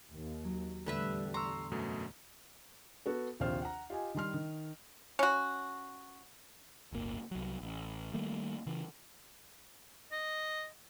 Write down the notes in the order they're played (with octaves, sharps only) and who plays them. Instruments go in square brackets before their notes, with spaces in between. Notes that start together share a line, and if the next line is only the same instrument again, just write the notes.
[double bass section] D#2
[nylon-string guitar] F#3
[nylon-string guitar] E2 A2 [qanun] D3 B4 E5 [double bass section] G3
[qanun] A#5 [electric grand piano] C6 C#6 E6
[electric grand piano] F#2 B2 A3
[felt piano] B3 F#4 A4
A#1 D#2 C3 F4 C5 F6
F#5 A#5
F4 G4 D#5 G#5
D#3 G3 C6 F6
D#3
[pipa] C#4 F#4
[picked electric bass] D1 G1 A#3
C2 F#3
A1
D#3 G3 A3 A#3
C#3 E3
[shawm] D#5